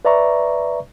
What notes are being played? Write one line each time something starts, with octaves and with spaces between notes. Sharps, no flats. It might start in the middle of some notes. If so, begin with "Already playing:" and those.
B4 D5 E5 A#5 C#6